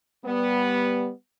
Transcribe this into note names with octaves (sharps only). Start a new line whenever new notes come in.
G3 B3